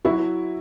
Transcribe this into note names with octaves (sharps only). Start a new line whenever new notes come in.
F#3 E4 F#4